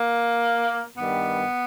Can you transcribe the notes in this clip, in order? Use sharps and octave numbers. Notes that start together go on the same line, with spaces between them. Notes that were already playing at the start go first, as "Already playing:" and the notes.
Already playing: A#3
G2 D#3 G3 B3